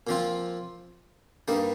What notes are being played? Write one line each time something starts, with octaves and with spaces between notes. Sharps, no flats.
A#2 F3 C4 F4
G2 G3 A#3 D#4